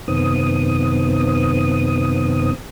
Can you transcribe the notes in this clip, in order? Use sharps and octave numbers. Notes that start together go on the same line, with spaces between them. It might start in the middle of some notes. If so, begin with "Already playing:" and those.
F#2 C3 D#3 B3 C4 D#6